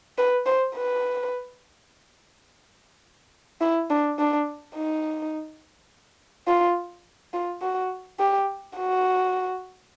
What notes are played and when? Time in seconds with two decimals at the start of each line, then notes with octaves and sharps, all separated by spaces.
0.18 B4
0.46 C5
0.76 B4
3.61 E4
3.90 D4
4.19 D4
4.76 D#4
6.48 F4
7.34 F4
7.62 F#4
8.19 G4
8.77 F#4